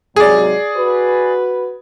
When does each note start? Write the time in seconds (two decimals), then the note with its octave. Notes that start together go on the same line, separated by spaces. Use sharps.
0.16 G#2 C3 F#3 G#4 D5
0.77 F#4 B4